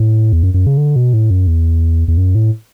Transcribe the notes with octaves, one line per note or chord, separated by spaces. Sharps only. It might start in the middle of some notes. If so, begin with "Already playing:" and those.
Already playing: A2
E2
F#2
F#2
C#3
D3
B2
A2
F#2
E2
E2
F#2
A2